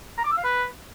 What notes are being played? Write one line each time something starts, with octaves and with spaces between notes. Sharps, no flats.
A#5
D6
E6
F5
B4